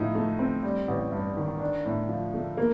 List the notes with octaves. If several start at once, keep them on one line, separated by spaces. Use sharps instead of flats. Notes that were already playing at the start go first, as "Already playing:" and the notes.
Already playing: A2 F3 D#4
A3
C4
G3
A1
G2
D#3
D4
A2
F3
A3
A#3